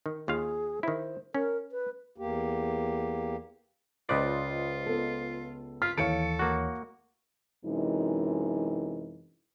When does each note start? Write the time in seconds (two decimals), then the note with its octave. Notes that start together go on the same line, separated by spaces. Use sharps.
0.06 D#3
0.28 D#2 F4 G#4 F5
0.83 D#3 E4 C5
1.34 C#4 A#4
1.72 B4
2.18 E2 A#3 G4
4.09 C#2 F4 B4 C5 D5 D#5
4.86 B3 A4
5.82 F4 F6 B6
5.98 D#2 E3 A4 C#5 F5 C#7 D7
6.39 A#3 F#4
7.65 F#2 C3 E3 G#3 D#4